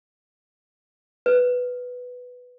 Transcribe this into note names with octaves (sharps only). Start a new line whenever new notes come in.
B4